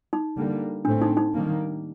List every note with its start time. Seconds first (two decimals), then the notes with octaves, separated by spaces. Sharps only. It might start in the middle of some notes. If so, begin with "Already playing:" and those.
0.13 D#4
0.36 D3 G3 A#3
0.85 A2 A3 C4 D4
1.02 D#4
1.17 D#4
1.34 D#3 G3 A#3